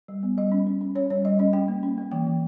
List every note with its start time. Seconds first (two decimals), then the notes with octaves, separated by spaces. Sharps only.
0.08 G3
0.23 B3
0.38 G3 D#5
0.52 C#4
0.67 C#4
0.81 C#4
0.95 C#4 C#5
1.10 G3 C#5
1.25 G3 D#5
1.39 C#4 D#5
1.53 C#4 G5
1.68 A#3
1.83 C#4
1.98 A#3
2.12 E3 G5
2.27 E3